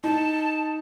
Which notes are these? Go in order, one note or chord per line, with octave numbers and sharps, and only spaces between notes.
D#4 A5